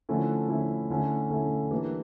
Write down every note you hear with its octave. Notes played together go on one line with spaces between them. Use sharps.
D3 F3 A3 C#4 E4
D3 F3 A3 C#4 E4
D3 A3 C#4 E4
D3 A3 C#4 E4
E3 G3 A#3 D4